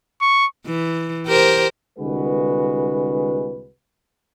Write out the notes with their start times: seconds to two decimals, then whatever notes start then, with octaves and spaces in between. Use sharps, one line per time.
0.21 C#6
0.66 E3
1.26 G4 A#4 C5
1.98 C2 D3 G#3 F#4 B4